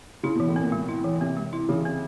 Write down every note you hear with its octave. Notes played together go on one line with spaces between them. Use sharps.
C#3 E4
B2
E3
A2
A#2 C4
G#3
E4
E3
C3 C4
G#3
E4
C#3 E3
C4